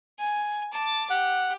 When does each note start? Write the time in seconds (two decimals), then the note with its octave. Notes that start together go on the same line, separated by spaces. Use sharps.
0.19 G#5
0.73 A5 D6
1.10 G4 F#5